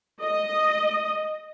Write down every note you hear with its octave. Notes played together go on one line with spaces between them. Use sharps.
D#5